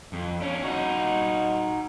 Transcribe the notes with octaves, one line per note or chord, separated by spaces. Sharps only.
F2
C#4 D4
D#4 F#4